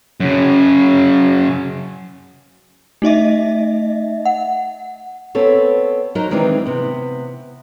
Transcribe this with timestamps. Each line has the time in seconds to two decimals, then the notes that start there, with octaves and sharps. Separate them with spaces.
0.20 F#2 C#3
3.02 A3 D#4 D#5 E5
4.25 F#5
5.35 B3 C4 A4 C#5
6.15 F#3 D#4 A#4 C5
6.31 D#3 E3 G#3 C4 D4 D#4
6.66 C3 B3